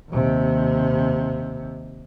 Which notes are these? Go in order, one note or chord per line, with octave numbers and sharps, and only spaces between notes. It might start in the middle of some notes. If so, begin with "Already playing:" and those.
D#2 C3